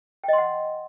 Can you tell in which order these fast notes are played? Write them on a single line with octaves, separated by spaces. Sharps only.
G5 D#5 C6 F#5